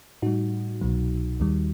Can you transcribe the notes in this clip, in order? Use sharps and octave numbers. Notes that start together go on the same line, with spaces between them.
A2 G3 D#4 F#4
C2 B2 F#3
D#2 D#3 G3